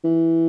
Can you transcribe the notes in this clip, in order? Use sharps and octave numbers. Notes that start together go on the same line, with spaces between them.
E3